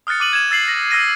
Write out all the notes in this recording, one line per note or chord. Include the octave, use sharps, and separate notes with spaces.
D#6 F6 F#6 A6 C#7
D6 D#7 F#7
G#6 E7
E6 A6 C7 F#7
A#6
E6 F6 A6 A#6 D#7